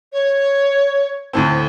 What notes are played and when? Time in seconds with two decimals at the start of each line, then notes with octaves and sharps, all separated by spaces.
0.12 C#5
1.33 D2 A2 C4